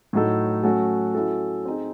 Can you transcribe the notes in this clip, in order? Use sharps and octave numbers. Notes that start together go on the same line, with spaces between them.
A2 F#3 A3 D#4 A4
F#3 A3 C#4 F#4 A4
F#3 C#4 E4 A4
C4 D#4 G#4